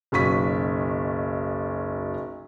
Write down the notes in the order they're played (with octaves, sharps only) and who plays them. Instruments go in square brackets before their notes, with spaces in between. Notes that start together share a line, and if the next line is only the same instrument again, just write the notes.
[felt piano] F#1 B1 C#6 B6